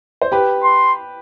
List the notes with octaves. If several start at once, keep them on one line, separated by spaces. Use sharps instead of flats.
C5
G4 B4
C6